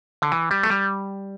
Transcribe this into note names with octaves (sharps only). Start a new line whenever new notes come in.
D3
E3
G3
A3
G3